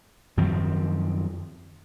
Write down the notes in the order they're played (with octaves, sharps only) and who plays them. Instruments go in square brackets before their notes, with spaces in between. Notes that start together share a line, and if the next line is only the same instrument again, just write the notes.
[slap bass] F#2 D#3 F3 C4